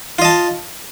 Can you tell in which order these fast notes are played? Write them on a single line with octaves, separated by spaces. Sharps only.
F4 D#5 A5